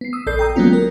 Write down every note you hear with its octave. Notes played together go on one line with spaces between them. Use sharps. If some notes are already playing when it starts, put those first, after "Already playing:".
B3 C7
D#6 E6
A#1 A4 D5 G6 C7
G5 A#5 D#6
F#3 G#3 A#3 B3 C#4 F4
A#4